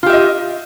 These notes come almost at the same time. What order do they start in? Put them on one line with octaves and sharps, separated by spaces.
F4 G4 E5 D#5